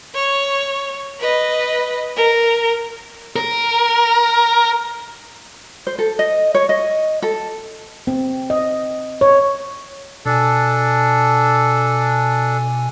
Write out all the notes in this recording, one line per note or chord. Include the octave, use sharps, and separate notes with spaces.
C#5
B4 D#5
A#4
A#4
C5
A4
D#5
C#5
D#5
A4
C4
D#5
C#5
B2 D4 A4 G#5